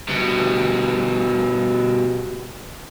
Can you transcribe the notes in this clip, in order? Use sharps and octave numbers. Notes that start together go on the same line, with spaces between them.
G2 B2